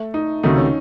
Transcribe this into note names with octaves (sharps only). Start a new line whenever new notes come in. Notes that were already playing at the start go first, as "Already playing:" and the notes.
Already playing: A3
D#4
C#2 C3 D#3 F#3 A3 D#4
C#4